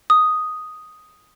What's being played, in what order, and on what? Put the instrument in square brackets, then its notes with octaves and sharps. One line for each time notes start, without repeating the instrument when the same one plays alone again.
[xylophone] D#6